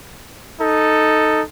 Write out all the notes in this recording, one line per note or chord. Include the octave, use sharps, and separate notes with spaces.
D#4 A4